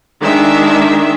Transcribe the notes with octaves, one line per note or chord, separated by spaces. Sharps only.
D#3 G#3 D4 E5